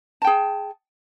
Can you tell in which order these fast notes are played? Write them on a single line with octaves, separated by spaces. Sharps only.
A5 G5 G#4